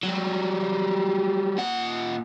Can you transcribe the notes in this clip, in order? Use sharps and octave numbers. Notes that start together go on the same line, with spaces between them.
F#3 G3
A#2 F#5